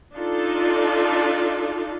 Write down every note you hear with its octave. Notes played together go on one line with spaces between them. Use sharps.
D4 D#4 F4 A4